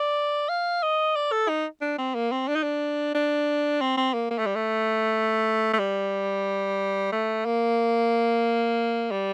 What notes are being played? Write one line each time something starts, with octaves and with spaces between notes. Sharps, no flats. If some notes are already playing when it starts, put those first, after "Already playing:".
Already playing: D5
F5
D#5
D5
A4
D#4
D4
C4
A#3
C4
D4
D#4
D4
D4
C4
C4
A#3
A#3
A3
G3
A3
A3
G3
A3
A#3
G3